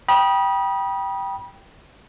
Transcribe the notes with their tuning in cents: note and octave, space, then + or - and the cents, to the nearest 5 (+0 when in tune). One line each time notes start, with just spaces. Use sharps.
G5 +0 B5 -35 D#6 +0